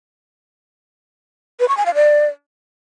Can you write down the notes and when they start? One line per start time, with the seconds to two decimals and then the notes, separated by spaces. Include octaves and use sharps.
1.60 B4
1.68 C#6
1.77 G#5
1.86 F5
1.95 D5